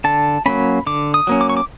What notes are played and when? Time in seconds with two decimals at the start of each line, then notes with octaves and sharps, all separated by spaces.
0.04 D3 A5
0.46 F#3 A#3 C#4 B5
0.87 D3 D6
1.14 D#6
1.27 F#3 A#3 C#4
1.41 D6
1.50 C#6
1.57 D6